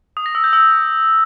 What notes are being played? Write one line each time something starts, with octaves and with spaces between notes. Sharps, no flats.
D#6
A#6
E6
G6
E6